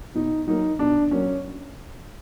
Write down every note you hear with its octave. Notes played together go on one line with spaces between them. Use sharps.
B2 D#4
F#3 A#3 D#4
B2 D4
F#3 A#3 C#4